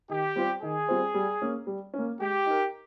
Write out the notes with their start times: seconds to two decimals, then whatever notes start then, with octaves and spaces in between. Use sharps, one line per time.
0.09 D#3 G4
0.36 G3 C4 F4 C5
0.62 D#3 G#4
0.88 G3 C4 F4 C5
1.14 G3
1.42 A#3 C#4
1.67 G3
1.94 C#4
1.99 A#3
2.20 G#3 G4
2.46 D#4 A#4